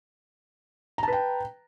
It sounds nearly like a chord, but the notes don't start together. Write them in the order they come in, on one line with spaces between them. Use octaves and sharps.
A#5 A5 B4 G5